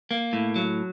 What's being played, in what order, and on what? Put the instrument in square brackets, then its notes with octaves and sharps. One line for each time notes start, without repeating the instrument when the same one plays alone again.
[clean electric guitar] A#3
A2
F#3